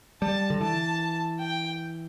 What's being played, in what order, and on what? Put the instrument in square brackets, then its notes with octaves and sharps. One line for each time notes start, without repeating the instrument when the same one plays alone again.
[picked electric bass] G3 [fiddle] A5
[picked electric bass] D3
[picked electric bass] E3 [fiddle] A5
[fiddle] G5